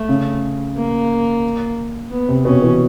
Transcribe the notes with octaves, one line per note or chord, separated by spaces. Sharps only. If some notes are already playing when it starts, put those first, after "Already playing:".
Already playing: A3
C#3
A#3
B3
C3
B2 C#4
E3